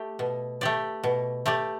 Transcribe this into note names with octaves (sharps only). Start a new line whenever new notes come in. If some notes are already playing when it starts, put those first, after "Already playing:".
Already playing: A3 G4
B2
A3 G4 D5
B2
A3 G4 D5